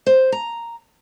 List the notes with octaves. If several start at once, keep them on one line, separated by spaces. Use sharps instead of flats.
C5
A#5